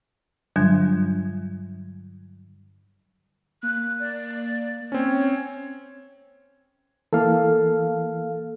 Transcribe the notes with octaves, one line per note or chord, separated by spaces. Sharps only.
G2 D3 F#3 G3 D4 G#6
A#3 F#6
D5
C4 C#4 C#5
E3 A#3 A4 F5